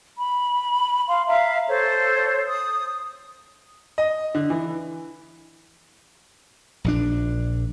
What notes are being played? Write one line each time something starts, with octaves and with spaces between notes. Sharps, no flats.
B5
F5 C6
E5 F5 A#5
A4 C5 C#5
D#6
D#5
D3
E3
A#1 D3 D4